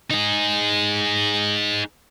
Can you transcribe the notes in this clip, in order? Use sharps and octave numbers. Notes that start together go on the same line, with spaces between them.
D#4 G#4